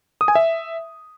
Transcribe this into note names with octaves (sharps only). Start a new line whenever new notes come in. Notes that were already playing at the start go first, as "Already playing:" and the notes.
D#6
G#5
E5